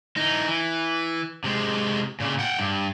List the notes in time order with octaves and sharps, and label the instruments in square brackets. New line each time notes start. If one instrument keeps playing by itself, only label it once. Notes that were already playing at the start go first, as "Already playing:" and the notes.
[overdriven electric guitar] E3 D#4
E3
C3 G#3
A#2 C#3
F#5 G5
G2